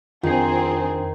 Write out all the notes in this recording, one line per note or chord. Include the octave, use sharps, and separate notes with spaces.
F2 D#3 C4 D4 F4 G#4 C7